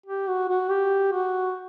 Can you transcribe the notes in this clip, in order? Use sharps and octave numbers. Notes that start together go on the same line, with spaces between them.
G4
F#4
F#4
G4
F#4